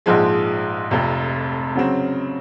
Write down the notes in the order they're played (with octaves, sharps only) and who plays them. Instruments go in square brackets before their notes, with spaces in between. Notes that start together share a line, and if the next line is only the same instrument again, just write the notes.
[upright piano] A#1 G#2 F3 G#3
F1 F2 C3
C#3 F#3 C4